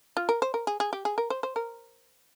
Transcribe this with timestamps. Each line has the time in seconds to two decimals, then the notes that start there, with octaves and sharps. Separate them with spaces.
0.17 F4
0.29 A#4
0.42 C5
0.54 A#4
0.67 G#4
0.80 G#4
0.93 G4
1.05 G#4
1.18 A#4
1.30 C5
1.43 C5
1.56 A#4